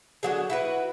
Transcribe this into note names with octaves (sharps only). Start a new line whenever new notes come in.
D3 F#3 G#4
E4 F#4 B4